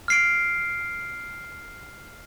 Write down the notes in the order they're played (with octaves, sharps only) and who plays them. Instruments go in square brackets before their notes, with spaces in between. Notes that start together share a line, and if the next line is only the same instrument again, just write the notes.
[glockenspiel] F6 C7 D7